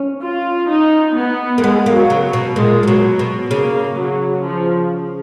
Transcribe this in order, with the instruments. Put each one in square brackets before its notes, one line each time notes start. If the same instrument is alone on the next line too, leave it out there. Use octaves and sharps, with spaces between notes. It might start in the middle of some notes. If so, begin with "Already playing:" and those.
Already playing: [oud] C#4
[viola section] F4
D#4
B3
[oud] A#3
[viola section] G#3 [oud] B3
[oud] A#3
[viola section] F#3
[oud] C#3
B2
[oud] A#2 [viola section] G#3
[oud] A#2
[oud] B2 [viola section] F#3
[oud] B2
[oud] C#3 [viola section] A#3
[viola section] F#3
F3